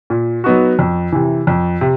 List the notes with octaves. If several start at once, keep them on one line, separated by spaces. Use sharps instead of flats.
A#2
F#3 B3 D#4 F#4
F2
C3 E3
F2
C3